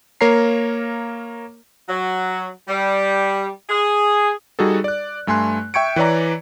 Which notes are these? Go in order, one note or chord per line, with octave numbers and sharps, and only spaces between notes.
A#3 A#4 C#5 A#5 C7
F#3
G3
G#4
G3 D#4 F#4 G#4 A4
D5 F#6
G2 A3 G#5 C6 F#6
E5 G5 C#6 G#6 C#7 D7
E3 B4 C#5 D5 A#5